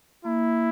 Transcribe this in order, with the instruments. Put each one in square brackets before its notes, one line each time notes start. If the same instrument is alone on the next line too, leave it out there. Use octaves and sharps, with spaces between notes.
[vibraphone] A#3 [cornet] E4